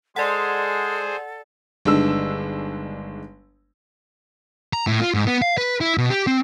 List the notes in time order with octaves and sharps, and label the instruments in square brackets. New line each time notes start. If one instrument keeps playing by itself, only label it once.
[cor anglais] G#3 [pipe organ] G#4 C5 [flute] A4 [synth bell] D5 F#5
[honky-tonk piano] G1 D#3 G#3 D4 E6
[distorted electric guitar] A#5
A2
F4
G#2
B3
F5
B4
E4
B2
G4
C4